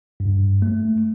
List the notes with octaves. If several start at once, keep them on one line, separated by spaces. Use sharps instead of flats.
G2
A3